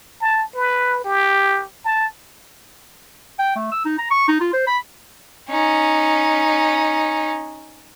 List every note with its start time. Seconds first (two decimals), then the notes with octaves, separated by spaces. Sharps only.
0.21 A5
0.55 B4
1.04 G4
1.85 A5
3.39 G5
3.56 A3
3.72 E6
3.85 D#4
3.98 A#5
4.10 C#6
4.28 D#4
4.40 F4
4.53 C5
4.67 B5
5.49 C#4 D#4